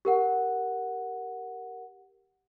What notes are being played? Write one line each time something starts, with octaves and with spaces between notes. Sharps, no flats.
G4 A#4 F#5